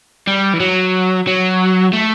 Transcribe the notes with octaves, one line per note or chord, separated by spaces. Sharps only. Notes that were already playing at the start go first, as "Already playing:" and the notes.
G3
E3
F#3
F#3
A3